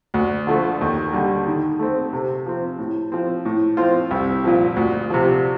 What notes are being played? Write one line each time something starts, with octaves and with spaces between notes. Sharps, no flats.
D2
D3 F3 A3
D#2
D3 G3
D#3
A3 C4
C3
F3 C4
A2
F3 C4
A2
F3 C4 F4
C2
A#2 F3
D2
C3 F3